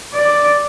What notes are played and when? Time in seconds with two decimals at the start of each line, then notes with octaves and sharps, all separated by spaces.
0.14 D5